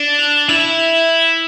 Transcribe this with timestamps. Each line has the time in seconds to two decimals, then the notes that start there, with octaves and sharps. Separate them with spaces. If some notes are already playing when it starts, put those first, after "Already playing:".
Already playing: D4
0.19 F7
0.49 E4 F7
0.79 F7
1.09 F7